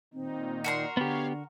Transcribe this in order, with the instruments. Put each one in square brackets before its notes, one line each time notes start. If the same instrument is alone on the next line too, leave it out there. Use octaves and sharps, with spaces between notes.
[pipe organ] A#2 D#3 D#4 [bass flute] C4
[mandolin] F#4 A#4 C6 [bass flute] D5
[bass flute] D3 [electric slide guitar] B3 G4 [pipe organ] C#5 F5